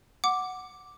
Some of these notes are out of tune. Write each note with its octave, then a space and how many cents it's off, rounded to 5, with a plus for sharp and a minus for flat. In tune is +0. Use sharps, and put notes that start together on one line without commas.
F#5 +0 D6 +0